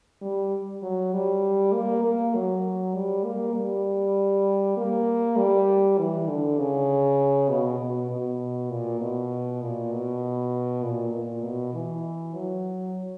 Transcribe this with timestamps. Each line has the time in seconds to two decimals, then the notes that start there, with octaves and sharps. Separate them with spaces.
0.22 G3
0.83 F#3
1.13 G3
1.73 A#3
2.04 A#3
2.34 F#3
2.95 G3
3.25 A#3
3.56 G3
4.77 A#3
5.37 G3
5.98 E3
6.28 D3
6.59 C#3
7.49 B2
7.80 B2
8.10 B2
8.71 A#2
9.01 B2
9.62 A#2
9.92 B2
10.83 A#2
11.13 A#2
11.44 B2
11.74 E3
12.34 F#3